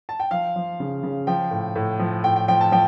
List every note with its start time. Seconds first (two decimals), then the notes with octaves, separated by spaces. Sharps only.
0.09 A5
0.20 G5
0.31 F3 F5
0.56 F3
0.80 C#3
1.03 C#3
1.27 F3 G5
1.51 A2
1.76 A2
1.99 F3
2.24 A2 G5
2.36 G5
2.48 F3 G5
2.61 A5
2.72 F3 G5